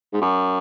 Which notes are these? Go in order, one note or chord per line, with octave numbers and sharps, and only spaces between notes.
G#2
F#2